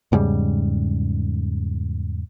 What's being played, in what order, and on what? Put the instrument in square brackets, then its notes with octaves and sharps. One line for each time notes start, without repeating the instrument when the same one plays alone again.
[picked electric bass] E2 G#2 C#3 G3